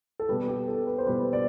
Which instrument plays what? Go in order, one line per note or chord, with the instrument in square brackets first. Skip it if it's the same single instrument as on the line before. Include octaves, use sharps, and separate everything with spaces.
[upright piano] A4
B2 G3 B4
G4
A4
B4
C5
B2 G3 B4
D5